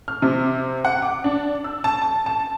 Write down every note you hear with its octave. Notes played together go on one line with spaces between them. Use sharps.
F6
C3
F#5
D6
D4
E6
A5
A5
A5